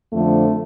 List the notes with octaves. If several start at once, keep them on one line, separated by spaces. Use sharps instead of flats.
F2 D3 F3 A3